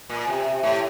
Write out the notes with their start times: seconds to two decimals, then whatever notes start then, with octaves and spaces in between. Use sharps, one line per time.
0.09 A#2
0.27 C3
0.63 A2